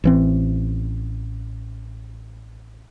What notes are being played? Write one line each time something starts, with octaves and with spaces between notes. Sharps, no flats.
A1 E3 C4